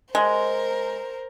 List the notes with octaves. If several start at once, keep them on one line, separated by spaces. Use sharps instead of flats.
G#3 A#4 C5